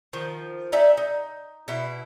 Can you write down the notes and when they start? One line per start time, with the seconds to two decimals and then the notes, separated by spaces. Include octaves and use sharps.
0.13 D#3 F3
0.72 D#4 D5 E5 G#5
0.97 D#4
1.68 B2 E4